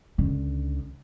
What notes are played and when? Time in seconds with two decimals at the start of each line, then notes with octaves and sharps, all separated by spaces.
0.18 C#2 D3